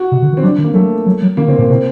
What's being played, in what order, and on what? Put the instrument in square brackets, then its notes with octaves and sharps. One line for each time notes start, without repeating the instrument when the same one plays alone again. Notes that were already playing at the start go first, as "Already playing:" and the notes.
Already playing: [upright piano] F#4
[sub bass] C3
D3
D#3
[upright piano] C4
[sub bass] F#3 [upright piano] D4
[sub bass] D#3
[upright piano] A#3
[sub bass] F#3 [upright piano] A3
[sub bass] F#3
F#3
[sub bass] D#3 [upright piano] A#3
[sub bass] D3 [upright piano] C4
[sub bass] A#2 [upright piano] A#3
[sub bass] C3 [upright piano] C4